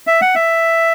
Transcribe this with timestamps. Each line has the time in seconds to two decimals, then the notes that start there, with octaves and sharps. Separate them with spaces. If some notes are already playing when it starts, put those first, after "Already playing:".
0.07 E5
0.21 F#5
0.35 E5